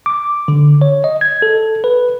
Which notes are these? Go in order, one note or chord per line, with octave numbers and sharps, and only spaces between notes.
D6
D3
C#5
D#5
G#6
A4
B4